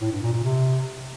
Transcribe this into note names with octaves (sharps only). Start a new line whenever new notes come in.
A2
G2
A#2
A#2
C3